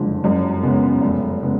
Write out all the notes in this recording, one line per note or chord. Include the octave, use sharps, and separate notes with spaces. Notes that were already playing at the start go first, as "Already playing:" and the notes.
Already playing: F#1 F2 D3 G#3
F#2
C#3 G#3 B3
F1
C#3 G#3 B3